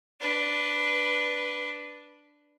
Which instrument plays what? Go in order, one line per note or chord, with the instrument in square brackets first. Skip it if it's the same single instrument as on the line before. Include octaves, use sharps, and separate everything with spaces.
[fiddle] D4 B4